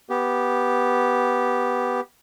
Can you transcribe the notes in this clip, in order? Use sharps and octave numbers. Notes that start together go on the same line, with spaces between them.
B3 G4